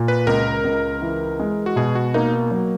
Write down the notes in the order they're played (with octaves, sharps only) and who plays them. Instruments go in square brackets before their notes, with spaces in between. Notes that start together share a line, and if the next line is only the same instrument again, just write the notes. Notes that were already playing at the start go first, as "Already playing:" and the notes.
Already playing: [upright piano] A#2
[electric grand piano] B4
[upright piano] C#2 [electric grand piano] A#4
[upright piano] C#2
E3
G#3
[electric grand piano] F#4
[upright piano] B2 [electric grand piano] G#4
[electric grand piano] F#4
[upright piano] A#3 [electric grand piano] D#4
[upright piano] F#3